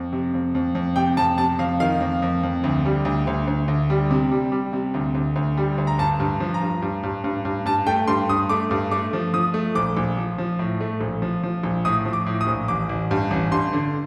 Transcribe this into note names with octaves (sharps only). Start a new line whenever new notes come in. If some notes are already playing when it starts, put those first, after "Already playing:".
Already playing: F2
C3
F2
F2
F2
C3 G5
F2 A5
C3 A5
F2 F5
D#3 F5
F2
F2
F2
D2
G3
D2
D2
D2
D2
G3
C3
G3
G3
C3
D2
D2
D2
G3
D2
A#5
G2 A5
G2
F3
A#5
G2
G2
G2
G2
G2
G2 A5
A3 G5
G2 C6
G2 D#6
A3 D6
G2
A3 D6
F3
F3 D#6
A3
A#1 D6
A#1
F3
F3
A2
A3
A#1
F3
F3
A#1
A2 D#6
F3
D6
A2
D#6
A#1
A1 D6
A1
G2
A1
G2 C6
D3